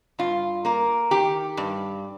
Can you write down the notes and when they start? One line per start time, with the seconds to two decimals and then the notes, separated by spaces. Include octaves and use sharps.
0.19 G2 F4
0.65 A#3 A#4
1.11 D#3 G4
1.57 G2